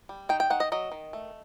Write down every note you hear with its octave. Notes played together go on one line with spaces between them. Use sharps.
G3
D#3 G5
G5
D#3 F#5
D#5
F#3 D#5
D#3
A3